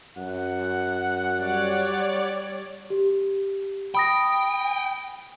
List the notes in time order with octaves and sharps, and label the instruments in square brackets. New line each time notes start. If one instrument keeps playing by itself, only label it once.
[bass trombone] F#2 [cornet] F#5
[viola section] G3 C#5 D5
[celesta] G4
[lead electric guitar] G5 [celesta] B5 D#6 A#6